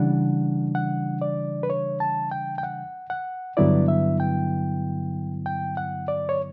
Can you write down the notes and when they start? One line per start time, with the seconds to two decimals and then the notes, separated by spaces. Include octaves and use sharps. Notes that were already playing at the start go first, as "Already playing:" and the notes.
Already playing: C#3 E3 G3 D4 F#5
0.75 F#5
1.22 D5
1.63 B4
1.70 C#5
2.00 A5
2.31 G5
2.58 G5
2.63 F#5
3.10 F#5
3.57 G2 D3 F#3 B3 E4 D5
3.88 E5
4.20 G5
5.46 G5
5.77 F#5
6.08 D5
6.29 C#5